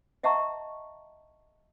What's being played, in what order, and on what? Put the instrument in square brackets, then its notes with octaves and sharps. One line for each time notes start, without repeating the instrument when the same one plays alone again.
[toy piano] D#5 E5 F#5 A5 A#5 C#6